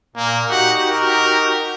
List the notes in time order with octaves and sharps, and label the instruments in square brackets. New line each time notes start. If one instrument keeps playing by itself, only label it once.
[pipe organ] A#2 [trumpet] A#3
[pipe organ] D#4 F#4 G4 [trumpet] F#5
[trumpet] A#4